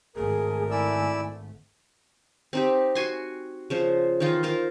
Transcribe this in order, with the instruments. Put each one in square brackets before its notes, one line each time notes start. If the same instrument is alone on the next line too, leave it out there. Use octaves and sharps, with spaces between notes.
[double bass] G#1 A3 [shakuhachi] G#4 [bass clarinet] A#4
[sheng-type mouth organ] E4 D5 E6 [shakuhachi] G#5
[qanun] C4 D#4 G4
F#4 G#5 C6
C#3 F3 C5
D#3 E3 D#4 F4
F4 A#4 C5